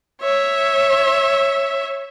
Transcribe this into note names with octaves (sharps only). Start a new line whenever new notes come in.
C#5 E5